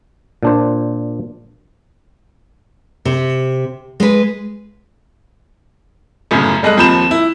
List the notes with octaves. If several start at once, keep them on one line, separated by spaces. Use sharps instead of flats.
A#2 D4 C5
C3
G#3 B4
G1 F#2 A2 C#3
G3 G#3 A4 D#5 F#6
D#2 F3 C4 B5 G6 E7
E4